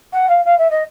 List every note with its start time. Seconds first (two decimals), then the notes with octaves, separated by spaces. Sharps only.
0.13 F#5
0.29 F5
0.45 F5
0.58 E5
0.70 D#5